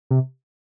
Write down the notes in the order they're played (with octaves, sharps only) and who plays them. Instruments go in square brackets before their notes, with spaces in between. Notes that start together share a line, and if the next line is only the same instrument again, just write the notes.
[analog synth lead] C3